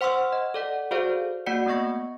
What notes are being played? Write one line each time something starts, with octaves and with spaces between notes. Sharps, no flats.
C5 F#5 C6 C#6 E6 F6
D#5
A4 D5 F#5
F#4 G#4 A4 C5 D5 F5
A#3 F#4 D5 F#5 C#7
A3 B3 D#5 C#6 A#6